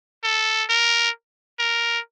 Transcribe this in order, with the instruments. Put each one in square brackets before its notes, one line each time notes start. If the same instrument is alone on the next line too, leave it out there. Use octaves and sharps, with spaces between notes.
[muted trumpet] A4
A#4
A#4